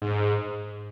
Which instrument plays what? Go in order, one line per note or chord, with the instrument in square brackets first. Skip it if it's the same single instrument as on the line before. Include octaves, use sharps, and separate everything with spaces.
[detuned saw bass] G#2